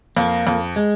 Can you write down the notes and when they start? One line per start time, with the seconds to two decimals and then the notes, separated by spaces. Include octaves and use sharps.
0.16 F2 A#3
0.47 F2
0.76 G#3